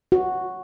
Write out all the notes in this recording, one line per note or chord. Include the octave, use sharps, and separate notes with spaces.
F#4